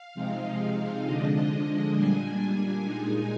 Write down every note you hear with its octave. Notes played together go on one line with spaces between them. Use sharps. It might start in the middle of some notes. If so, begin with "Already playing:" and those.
Already playing: F5
C3 F3 G#3 C4 D#4
D3 F3 G#3 D4 D#5
A#2 G3 D4 G#5
A#2 G#3 D#4